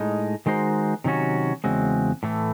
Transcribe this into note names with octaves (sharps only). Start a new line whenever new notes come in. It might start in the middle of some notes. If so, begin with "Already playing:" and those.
Already playing: A2 G#3 D#4
D#3 G#3 D#4 F#4 C5
C3 D#3 F#3 C#4 F#4
E2 C#3 G#3 C4 F#4
A2 E3 A3